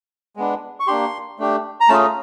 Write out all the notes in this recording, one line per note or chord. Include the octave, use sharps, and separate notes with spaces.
G#3 B3 D4
C#6
A#3 D4 G4 C6
A3 D4 G4
A#5
A3 C#4 F4 G#4 A5